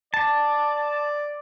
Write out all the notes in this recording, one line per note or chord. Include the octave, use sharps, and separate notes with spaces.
D5 A5